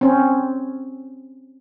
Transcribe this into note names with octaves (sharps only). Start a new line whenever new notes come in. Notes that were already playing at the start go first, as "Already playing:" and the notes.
C4 C#4